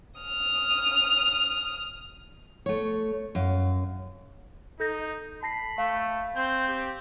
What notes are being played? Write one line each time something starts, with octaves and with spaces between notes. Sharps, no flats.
D#6 F6
A3 C#5
F#2 F5
D#4 A4 G6 A#6
A5 B5 A#6 C7
A3 F5
C4 G6
G4